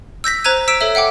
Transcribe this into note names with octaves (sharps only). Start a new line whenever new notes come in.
E6 G6 A#6 B6
C5 A#5 F#6 G#6 D#7
E6 B6 D7 E7
A4 C#5 E5
E5 F#5 G5 D6